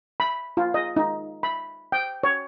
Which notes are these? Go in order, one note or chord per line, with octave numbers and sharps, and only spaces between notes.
B5
F4
D#5
D#4
B5
G5
C#5